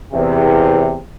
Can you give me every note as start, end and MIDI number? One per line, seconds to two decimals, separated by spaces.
0.13 0.96 40
0.13 0.96 48